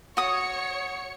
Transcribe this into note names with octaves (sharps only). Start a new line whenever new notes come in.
F#4 C#5 D#6 C#7